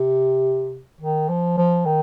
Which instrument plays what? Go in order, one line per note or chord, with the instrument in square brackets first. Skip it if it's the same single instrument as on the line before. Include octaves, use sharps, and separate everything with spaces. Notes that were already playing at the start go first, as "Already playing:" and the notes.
Already playing: [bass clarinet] C3
D#3
F3
F3
D#3